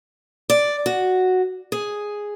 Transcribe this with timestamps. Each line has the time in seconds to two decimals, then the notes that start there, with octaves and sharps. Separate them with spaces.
0.50 D5
0.86 F#4
1.72 G#4